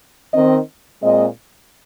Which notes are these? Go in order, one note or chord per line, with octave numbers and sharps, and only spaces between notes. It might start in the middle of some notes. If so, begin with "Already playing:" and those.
D#3 C4 D#5
A#2 G#3 C4 D#5